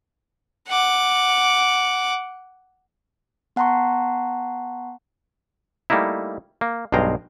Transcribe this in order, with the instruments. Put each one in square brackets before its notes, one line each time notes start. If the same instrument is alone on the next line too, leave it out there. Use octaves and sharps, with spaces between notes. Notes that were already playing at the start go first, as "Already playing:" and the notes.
[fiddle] F#5 D6
[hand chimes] B3 F#5 A5 A#5 C6 C#6
[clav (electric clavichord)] G3 A3 A#3 D#4 E4
A#3
B1 G2 G#3 F5 G5 A#5